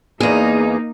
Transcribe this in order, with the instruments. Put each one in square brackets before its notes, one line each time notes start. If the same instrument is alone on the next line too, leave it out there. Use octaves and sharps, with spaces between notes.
[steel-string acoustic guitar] E2 G#4 [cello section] A#3 D#4